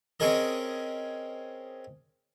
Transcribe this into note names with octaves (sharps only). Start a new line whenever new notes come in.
C4 C#4 G#4 A#4 D#5